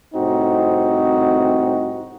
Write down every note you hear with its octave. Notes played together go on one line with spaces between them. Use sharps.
C2 A2 C4 D#4 F#4